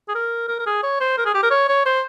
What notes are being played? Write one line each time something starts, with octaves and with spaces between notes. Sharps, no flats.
G#4
A#4
A#4
A#4
G#4
C#5
C5
A#4
G#4
G4
A#4
C#5
C#5
C5